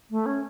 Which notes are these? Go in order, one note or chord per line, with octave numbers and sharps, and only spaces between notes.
A3
C#4